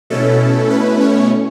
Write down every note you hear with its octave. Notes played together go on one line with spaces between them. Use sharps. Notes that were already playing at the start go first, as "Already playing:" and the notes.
B2 A3 C#4 E4 A4
B4
C#5